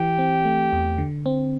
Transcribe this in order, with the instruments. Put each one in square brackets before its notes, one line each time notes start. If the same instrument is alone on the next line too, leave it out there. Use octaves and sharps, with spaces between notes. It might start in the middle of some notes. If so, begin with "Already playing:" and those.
Already playing: [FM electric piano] E3 [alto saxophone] G4
[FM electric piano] C4
A3
E2
D3
C4